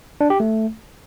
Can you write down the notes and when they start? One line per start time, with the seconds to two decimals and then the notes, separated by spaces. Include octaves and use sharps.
0.21 D4
0.30 G4
0.40 A3